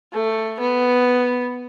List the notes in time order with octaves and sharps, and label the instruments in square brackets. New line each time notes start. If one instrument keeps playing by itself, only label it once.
[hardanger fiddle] A3
B3